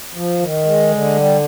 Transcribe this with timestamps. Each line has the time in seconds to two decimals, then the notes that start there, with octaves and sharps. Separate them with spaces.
0.14 F3
0.39 D#3
0.65 G#3
0.91 D3
1.16 G3